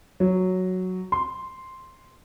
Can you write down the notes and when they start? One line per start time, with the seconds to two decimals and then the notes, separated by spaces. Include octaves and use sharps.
0.20 F#3
1.12 C6